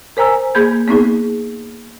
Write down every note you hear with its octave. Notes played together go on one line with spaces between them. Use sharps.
A#4 C5 G#5 A#5 E6
A#3 G#4 B5 G6 G#6
A#3 B3 D#4 G#4